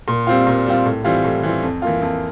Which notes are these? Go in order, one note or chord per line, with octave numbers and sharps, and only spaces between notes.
A#2
G3 C4 F4
A#2
G3 C4 F4
A2
E3 G3 C4 F4
A2
E3 G3 C4 F4
F2
E3 A#3 F4
F2